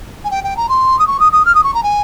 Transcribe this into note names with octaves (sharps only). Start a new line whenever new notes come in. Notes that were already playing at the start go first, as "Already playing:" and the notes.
G#5
G5
G5
A#5
C6
D#6
C#6
D#6
D#6
F6
D#6
C#6
A#5
G#5